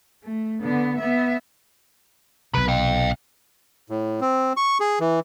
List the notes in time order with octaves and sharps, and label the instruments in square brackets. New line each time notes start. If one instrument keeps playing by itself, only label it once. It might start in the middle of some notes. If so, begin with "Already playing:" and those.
[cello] A3
D3 B3
B3 E5
[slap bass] B1 C3 [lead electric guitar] B4 B5
[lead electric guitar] F5 G5
[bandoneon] A2
C4
C#6
G#4
E3